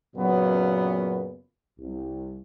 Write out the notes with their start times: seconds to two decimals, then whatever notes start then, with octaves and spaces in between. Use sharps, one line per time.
0.16 F#2 A#2 C#3 F#3 B3
1.79 C2